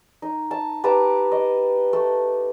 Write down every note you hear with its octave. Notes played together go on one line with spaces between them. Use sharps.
D#4
A5
G4 B4 A5 A#5
D#5
A3